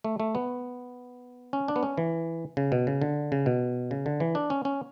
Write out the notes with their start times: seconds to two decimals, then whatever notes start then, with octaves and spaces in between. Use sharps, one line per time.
0.04 A3
0.20 A3
0.35 B3
1.53 C#4
1.68 D4
1.76 B3
1.83 C#4
1.98 E3
2.57 C#3
2.72 B2
2.87 C#3
3.02 D3
3.32 C#3
3.46 B2
3.91 C#3
4.06 D3
4.20 E3
4.35 D4
4.50 C#4
4.65 C#4